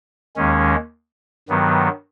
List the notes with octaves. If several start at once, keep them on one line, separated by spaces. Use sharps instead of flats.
D#2 D#3 G#3 C#4
G2 D#3 F#3 B3